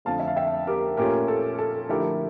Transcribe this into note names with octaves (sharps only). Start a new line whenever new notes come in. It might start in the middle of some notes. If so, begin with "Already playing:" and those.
F2 D3 F3 A3 F5 A5
E5
F5
E5 G5
G4 A#4
A#2 A3 C#4 F4 G4 A#4
A4
A4
D3 F3 A3 E4 G4 A#4